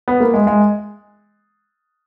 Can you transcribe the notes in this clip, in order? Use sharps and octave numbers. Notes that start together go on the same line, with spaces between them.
B3
A#3
G#3
G#3